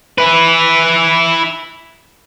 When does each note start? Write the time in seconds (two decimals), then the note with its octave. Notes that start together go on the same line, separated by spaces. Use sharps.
0.18 E4 B4